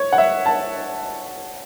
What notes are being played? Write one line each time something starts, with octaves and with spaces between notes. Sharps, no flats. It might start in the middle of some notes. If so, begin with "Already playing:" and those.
Already playing: C#5
F#5
E5
A5